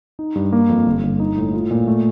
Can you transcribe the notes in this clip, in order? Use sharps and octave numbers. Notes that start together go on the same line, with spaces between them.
D#4
G2
A#3
F2
G1
G1
D#4
A2
F4
A#2
A3